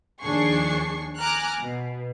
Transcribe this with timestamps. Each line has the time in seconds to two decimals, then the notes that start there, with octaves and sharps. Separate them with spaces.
0.22 D#2 F3 D4 G#4 C#6 C7
1.17 G#5 A#5 D6 F6 F#6
1.60 B2